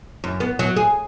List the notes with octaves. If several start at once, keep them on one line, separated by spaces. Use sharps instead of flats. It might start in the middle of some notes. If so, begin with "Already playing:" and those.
F#2
B3
F#3
G#4